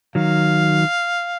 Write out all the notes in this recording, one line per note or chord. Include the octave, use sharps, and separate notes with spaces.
D#3 F#3 F5